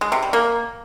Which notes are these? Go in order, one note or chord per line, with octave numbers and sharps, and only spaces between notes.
G#3
C3
G3
A#3